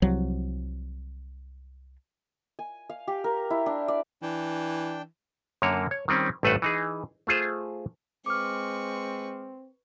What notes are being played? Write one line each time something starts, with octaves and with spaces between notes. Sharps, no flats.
C2 F3 F#3
G#5
F5
G4
A#4
E4
D4
D5
E3 D4 G5
F#2 D3 A#3 C#5
C#5
D#3 G3 C4 C#4
A1 G2 A3 B4 C5 F#5
E3 D#4 G#4
A3 F4 G#4 C5
G#3 C4 B4 C#6 D6 F6